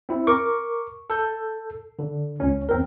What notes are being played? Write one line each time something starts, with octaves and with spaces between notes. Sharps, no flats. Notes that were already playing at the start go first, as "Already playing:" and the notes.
C4 E4
A#4 C#6 D6
A4 G6
D3
C#2 C#4
E2 C4 A#4